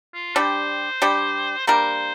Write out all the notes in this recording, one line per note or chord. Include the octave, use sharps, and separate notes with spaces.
F4
G3 D4 G4 C5
G3 D4 G4
G3 A#3 D4 A#4 C5